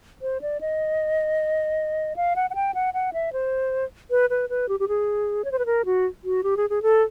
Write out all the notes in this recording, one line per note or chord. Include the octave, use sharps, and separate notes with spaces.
C5
D5
D#5
F5
F#5
F#5
G5
F#5
F#5
E5
C5
B4
B4
B4
G4
G4
G#4
C#5
C5
B4
A#4
F#4
F#4
G4
G#4
G#4
A4